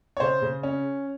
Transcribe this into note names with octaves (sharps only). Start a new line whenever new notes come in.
C#5
C#3 C5
C#3
C#4